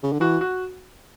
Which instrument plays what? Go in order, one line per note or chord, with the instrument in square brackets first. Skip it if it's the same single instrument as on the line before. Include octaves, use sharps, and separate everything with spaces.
[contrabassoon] C#3
D3
[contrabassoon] E3 [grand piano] F#4
[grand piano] F#4